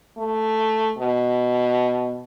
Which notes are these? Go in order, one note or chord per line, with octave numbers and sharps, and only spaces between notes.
A3
B2